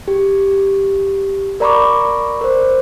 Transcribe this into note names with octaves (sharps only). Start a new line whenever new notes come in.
G4
A#4 D5 A#5 B5 C#6 D6
A#4 C5